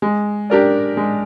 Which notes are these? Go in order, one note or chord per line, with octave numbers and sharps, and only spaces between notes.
G#3
D4 G4 A#4 D5
G#3